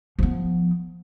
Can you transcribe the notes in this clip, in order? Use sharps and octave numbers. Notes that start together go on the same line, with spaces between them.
F3 B3